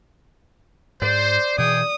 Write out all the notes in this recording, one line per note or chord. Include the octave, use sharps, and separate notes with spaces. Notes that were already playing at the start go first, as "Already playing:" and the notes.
G#2 C5 D5
B2 E3 G#4 G5 D#6